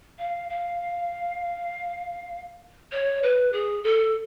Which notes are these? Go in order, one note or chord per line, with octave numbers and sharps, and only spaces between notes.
F5
F5
C#5
B4
G#4
A4